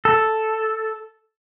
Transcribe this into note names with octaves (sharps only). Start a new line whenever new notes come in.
A4